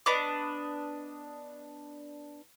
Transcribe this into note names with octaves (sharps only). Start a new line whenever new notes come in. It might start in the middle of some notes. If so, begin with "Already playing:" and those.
B3 D4 D#5 D6